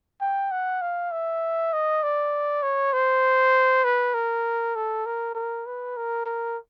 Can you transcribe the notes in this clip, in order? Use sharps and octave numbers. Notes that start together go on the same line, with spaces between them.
G5
F#5
F5
E5
D#5
D5
C#5
C5
B4
A#4
A4
A#4
A#4
B4
A#4
A#4